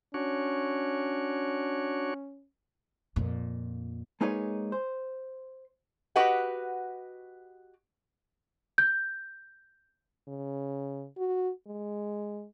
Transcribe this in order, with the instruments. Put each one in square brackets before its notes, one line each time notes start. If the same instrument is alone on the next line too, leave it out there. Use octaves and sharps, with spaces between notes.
[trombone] C#4 [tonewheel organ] D4 F#4 C#5
[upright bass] F2 A#2
[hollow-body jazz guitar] G#3 A#3 D#4 G#4 B4 C#5
C5
[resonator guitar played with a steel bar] F#4 G4 B4 D#5 F#5
[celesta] G6
[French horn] C#3
F#4
G#3